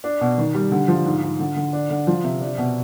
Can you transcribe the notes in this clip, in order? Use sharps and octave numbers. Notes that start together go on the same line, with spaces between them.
D4
B2
D#3
G3
D3
F3
G#2
G#2
D3
D3
D4
D3
F3
C3
D4
B2